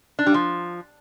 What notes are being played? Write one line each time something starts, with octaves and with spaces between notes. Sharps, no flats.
D4
G3
F3